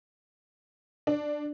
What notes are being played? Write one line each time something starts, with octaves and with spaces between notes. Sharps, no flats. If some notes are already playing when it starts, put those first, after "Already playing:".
D4